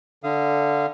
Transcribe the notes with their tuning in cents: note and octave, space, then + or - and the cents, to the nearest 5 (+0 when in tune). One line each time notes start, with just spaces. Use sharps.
D3 +0 F5 -25 D#6 +0